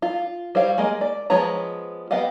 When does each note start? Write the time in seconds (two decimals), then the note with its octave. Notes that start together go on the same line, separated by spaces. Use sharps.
0.02 F4
0.55 G3 C5 C#5 F5
0.78 G#3 A#3 D#5
1.01 D5
1.30 F3 G#3 B3 C#5 A#5
2.11 B3 G4 D#5 F5 F#5